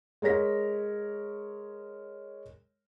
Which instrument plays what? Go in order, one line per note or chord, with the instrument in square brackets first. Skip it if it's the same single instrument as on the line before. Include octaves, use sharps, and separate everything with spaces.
[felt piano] G#3 A#4 C#5 A#6 B6